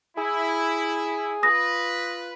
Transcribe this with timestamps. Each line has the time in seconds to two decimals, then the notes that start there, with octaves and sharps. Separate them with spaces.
0.17 E4 G#4
1.43 F4 B4 D#6 A#6